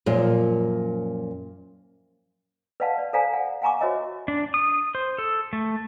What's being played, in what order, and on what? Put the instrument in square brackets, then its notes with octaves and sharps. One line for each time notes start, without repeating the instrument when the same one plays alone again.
[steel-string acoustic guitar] F#2 A#2 F3
[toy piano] B4 D5 D#5 F5 F#5 A5
D5
A4 C5 D5 F5 G#5 A#5
F#5
F5 F#5 G#5 A#5 C#6 D6
F#4 C5 C#5 D#5 E5
[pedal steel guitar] D4
D#6
C5
A4
A3